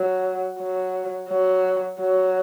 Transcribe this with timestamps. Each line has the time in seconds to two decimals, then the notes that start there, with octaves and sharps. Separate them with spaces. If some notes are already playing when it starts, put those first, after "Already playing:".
Already playing: F#3
0.59 F#3
1.29 F#3
2.00 F#3